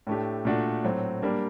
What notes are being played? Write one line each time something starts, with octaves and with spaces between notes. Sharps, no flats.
A2 A3 D4 G4
A#2 A3 D4 F#4
A2 F#3 C4
G3 A#3 D4